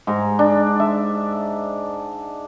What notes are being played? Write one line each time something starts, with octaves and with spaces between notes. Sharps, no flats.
G#2 A#5
D4
E5